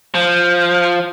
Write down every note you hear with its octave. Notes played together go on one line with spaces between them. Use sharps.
F3